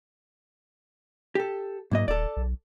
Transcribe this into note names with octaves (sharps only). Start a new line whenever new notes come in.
G4 A4
B1 G#2 A#3 D#5
D#1 A4 D5
B1